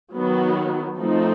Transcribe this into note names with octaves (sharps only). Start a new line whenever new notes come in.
D#3 F#3 B3
F3 A3 C4 D#4